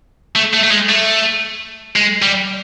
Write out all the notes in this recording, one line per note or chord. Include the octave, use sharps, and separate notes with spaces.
A3
A3
A3
G#3
A3
G#3
G3